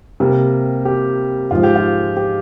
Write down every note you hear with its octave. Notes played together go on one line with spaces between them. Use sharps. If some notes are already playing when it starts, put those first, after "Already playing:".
C3 G3 A#3
G4
G#2 F3 G#3 F4
G4
F4
G4